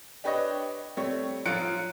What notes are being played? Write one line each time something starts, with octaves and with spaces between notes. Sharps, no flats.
D4 G4 B4 C#5 D#5
G3 A3 C4 C#5
F3 F#3 F4 F#6 C#7 D7